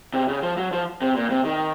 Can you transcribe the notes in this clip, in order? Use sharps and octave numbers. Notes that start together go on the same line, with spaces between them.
C3
C#3
F3
F#3
F3
C3
A#2
C3
D#3